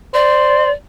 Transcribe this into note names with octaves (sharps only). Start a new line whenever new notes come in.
C5 D5